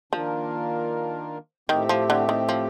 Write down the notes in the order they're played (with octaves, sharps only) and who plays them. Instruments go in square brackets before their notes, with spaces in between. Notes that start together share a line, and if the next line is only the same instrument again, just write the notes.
[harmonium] D#3 A#3 D4 F4 A#4 [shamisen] F3
[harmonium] A2 A3 C4 G4 [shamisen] D#3
[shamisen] F3
D3
D#3
F3